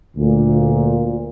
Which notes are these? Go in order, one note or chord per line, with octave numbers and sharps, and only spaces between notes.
D2 A#2